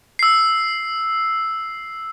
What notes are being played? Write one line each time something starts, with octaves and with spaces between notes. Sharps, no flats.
E6 C7